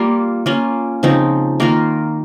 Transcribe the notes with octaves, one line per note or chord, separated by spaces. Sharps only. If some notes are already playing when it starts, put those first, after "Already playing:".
Already playing: G3 A#3 F4
A#3 C#4 F4
C#3 F3 C4 D#4
D#3 A#3 F4 A#4